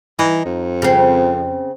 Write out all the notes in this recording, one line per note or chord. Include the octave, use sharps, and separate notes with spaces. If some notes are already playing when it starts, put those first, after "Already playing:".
E3 D#4
F2
C#3 C4